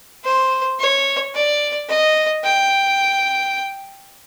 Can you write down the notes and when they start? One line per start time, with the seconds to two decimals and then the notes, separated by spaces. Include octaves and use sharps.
0.24 C5
0.79 C#5
1.35 D5
1.89 D#5
2.44 G5